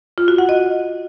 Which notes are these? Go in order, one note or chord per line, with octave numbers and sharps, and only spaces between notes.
F4
F#4
F#5
D#5